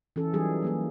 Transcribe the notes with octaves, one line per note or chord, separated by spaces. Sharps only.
E3 C#4 E4 A4
E3 F#3 G3 D#4 G#4
F#3 A#3 G#4